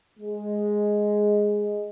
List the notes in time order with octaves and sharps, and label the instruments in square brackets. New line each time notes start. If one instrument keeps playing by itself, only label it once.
[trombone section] G#3